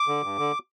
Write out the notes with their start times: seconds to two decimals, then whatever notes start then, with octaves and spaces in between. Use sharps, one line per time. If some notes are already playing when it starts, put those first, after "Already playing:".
Already playing: D6
0.08 D3
0.23 G2
0.38 D3